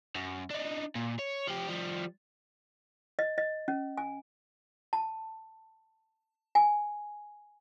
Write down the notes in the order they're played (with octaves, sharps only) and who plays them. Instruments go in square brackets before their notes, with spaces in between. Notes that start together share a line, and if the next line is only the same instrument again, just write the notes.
[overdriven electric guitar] F#2
D4 D#4
A#2
C#5
F3 G4
F3 G3
[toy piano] D#5
D#5
C#4
G#5
A5
G#5